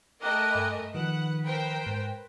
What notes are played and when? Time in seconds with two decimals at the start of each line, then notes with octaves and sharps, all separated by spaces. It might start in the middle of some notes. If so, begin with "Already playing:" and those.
0.22 A3 A#4 D#5 G5 D6 F#6
0.52 G2 G#5 B5
0.95 D#3 F3 B4 F#5
1.46 A#4 C5 G5
1.86 G#2